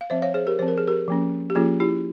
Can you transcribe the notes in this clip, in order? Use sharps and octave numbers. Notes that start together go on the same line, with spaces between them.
F5
F3 C4 C5 E5
C#5 F5
G#4 C5
G4 A#4
F3 C4 C5
A#4
G#4
G4 A#4
F3 A#3 C#4
G4
F3 A#3 C#4 F4 G#4
E4 G4